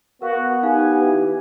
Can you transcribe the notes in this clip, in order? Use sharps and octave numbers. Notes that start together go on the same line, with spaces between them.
B3 F#4 A#4 F5
D#4 G4 F5 G#5 F#6
E3